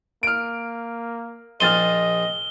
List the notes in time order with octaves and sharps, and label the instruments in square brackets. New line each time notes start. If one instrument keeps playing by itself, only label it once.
[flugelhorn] A#3 [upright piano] F6 D7
[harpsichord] A#1 C5 [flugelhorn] D#5 [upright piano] F6 A6 D#7 [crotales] G7